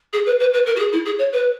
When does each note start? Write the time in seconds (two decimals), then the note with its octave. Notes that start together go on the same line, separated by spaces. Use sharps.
0.13 G#4
0.26 B4
0.40 B4
0.53 B4
0.66 A#4
0.76 F#4
0.79 G#4
0.92 E4
1.05 G#4
1.19 C#5
1.33 B4